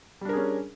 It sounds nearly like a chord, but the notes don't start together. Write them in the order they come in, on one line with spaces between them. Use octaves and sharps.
G3 D4 A#4 G#4 C#4